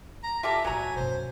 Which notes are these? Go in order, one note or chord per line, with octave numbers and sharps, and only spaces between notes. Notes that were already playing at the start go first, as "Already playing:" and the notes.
A#5
F4 G4 A4 E5
A2 F#3 A3 G#5 A#5
F#2 B2 C5